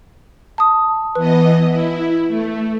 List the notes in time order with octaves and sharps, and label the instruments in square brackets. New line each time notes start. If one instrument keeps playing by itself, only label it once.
[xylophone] A5 D#6
[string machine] E3 B3 D#5 [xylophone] B4
[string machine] E4
A3